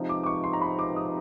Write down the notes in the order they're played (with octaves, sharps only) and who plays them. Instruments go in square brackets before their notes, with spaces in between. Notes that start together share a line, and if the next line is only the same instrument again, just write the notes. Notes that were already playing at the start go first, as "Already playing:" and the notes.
Already playing: [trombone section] C3 F3 G#3 C4 D#4
[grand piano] D6
D6
C#6
C6
A#5
B5
D6
D#6